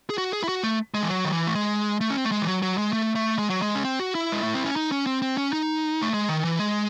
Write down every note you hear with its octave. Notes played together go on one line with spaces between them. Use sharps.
G#4
F#4
G#4
E4
F#4
A3
G#3
E3
F#3
D#3
E3
A3
G#3
A3
C#4
C4
A3
G#3
E3
F#3
F#3
G#3
A3
A3
G#3
F#3
G#3
C#4
C4
F#4
E4
G#3
A3
C4
C#4
D#4
C#4
C4
C4
C#4
D#4
A3
G#3
D#3
E3
G#3